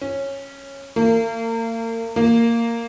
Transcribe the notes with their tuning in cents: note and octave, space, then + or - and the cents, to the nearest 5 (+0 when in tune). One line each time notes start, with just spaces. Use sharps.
C#4 -10
A#3 -35
A#3 -10